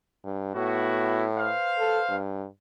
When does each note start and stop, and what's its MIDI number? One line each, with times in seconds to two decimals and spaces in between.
0.25 0.51 43
0.55 1.50 45
0.55 1.27 59
0.55 1.27 64
0.55 1.27 66
1.37 2.17 71
1.37 2.17 72
1.37 2.17 77
1.79 2.00 69
2.10 2.46 43